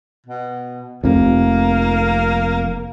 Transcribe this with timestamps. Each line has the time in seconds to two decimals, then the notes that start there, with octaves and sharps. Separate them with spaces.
0.26 B2
1.04 F1 F2 A#3